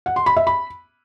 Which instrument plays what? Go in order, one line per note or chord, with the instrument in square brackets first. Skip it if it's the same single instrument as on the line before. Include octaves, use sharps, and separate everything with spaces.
[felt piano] F#5
C6
B5
E5
B5